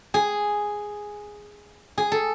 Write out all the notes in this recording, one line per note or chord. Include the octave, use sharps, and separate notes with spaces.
G#4
G#4
A4